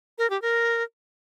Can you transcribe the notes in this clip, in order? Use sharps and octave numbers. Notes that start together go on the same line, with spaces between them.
A#4
G4
A#4